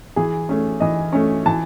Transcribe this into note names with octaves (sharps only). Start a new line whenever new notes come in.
E3 G#4
A3 C#4
E3 D#5
A3 C#4
E3 A5